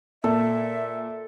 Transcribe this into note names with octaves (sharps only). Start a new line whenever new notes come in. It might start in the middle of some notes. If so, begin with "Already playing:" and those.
A#2 A4 E5